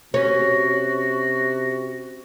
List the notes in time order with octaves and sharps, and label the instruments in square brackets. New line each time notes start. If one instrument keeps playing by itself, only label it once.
[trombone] C3 [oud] C#4 [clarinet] F#4